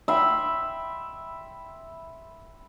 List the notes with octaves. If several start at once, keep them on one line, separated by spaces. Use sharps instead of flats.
E5 G5 B5 C6